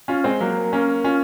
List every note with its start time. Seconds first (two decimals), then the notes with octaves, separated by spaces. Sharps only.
0.08 C#4 F4
0.24 G#3 C4
0.40 F#3 A#3
0.73 A#3 C#4
1.04 C#4 F4